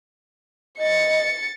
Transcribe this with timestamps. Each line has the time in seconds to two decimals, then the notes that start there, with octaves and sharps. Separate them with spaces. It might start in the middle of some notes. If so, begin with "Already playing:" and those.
0.78 D#5 A6 C#7